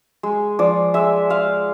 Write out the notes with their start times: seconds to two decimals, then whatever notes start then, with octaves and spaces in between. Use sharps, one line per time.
0.23 G#3
0.59 F3 D5
0.94 G#3 E5
1.30 G#3 F5